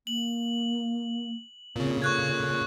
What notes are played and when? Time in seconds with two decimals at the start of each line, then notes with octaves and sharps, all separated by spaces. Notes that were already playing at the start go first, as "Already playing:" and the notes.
0.07 A#3 F#7
1.76 A#2 C#3 C4
2.02 A4 C#6 F#6 G#6